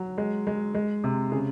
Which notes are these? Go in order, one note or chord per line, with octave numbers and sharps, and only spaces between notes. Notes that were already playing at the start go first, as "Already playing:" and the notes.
Already playing: F#3
G#3
G#3
G#3
C3
C#3 G#4